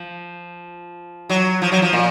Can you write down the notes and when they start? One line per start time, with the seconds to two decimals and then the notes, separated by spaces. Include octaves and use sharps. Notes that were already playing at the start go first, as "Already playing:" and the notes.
Already playing: F3
1.29 F#3
1.62 F3
1.72 F#3
1.82 F3
1.93 A#2